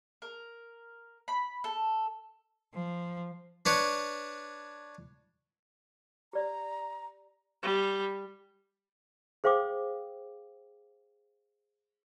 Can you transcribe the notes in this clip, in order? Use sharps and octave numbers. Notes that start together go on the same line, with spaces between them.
A#4
B5
A4
F3
D4 B4 C#5
G4 D5 A#5
G3
G#4 C5 F5 G5 D6 D#6